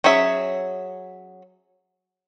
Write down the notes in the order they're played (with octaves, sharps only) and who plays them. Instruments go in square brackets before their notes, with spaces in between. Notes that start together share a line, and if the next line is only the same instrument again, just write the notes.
[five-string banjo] F#3 C#4 G#4 E5